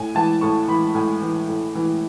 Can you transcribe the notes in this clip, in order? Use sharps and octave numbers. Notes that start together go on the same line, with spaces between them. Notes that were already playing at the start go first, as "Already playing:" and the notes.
Already playing: A2 G#5
E3 A5
A2 C#6
E3 B5
A2 G#5
E3
A2
E3